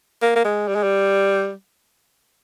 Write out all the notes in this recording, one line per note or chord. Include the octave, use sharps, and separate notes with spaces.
A#3
A#3
G#3
G3
G#3
G3